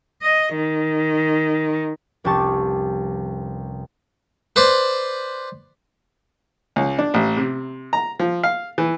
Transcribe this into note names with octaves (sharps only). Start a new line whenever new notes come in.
D#5
D#3
F1 C2 C#4 G4 A5 C#6
B4 C5 D5
C#2
D4
A1
C3
A#5
F3
F5
E3